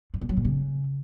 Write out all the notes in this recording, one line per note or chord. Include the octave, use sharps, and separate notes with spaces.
G2
A#2
F#3
A#2
C#3